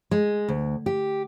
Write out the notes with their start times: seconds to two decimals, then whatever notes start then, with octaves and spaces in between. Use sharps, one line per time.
0.11 G#3
0.48 D2
0.86 G4